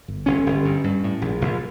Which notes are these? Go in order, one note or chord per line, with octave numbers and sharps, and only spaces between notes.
G1
G1 C#4
G1
G2
G2
A2
A#1
A#1